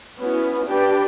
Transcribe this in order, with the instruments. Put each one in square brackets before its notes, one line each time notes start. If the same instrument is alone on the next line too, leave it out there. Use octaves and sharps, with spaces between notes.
[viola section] B3 C#4 E4 F#4
D4 G4 B4 D5 G5